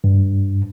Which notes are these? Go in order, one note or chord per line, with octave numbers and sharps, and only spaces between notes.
G2